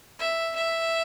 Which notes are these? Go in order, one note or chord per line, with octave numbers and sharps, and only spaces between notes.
E5
E5